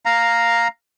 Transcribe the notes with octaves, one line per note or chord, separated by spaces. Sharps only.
F5 A#5